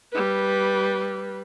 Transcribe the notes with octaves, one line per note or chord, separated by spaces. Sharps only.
G3 B4